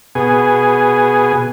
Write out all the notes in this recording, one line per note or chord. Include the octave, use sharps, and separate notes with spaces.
B2 G#4